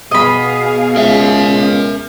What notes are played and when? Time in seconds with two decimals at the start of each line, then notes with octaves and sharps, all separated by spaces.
0.11 B2 G#4 D#5 F5 B5
0.96 C#2 A#4 E5